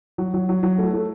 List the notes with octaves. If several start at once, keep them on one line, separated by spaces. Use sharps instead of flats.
F#3
F#3
F#3
F#3
A3
A3